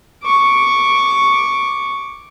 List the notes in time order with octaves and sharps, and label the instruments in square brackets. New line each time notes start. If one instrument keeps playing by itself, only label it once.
[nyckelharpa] C#6 D6